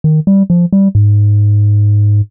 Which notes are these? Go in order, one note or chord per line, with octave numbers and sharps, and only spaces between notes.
D#3
G3
F3
G3
G#2